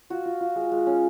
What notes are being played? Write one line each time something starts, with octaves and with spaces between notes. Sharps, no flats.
F4 F#4
F4
F4
G#3
G#3
C#4